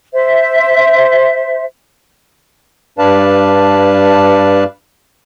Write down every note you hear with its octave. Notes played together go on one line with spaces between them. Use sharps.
C5 E5
G2 D4 B4 D5 F5 A5